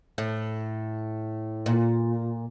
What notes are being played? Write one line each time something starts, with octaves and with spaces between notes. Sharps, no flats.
A2
A#2